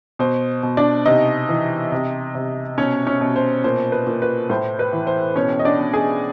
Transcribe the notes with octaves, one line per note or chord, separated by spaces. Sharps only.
B2 C5
B2
D4 D5
C3 D#4 D#5
E3
C3
C3
B2 C#4 C#5
C#4 C#5
B2
C5
A#2 C5
B4
A#2
B4
A2 C5
B4
E3
C5
B2 C#4 C#5
D#5
D4 D5
B2
G#4 G#5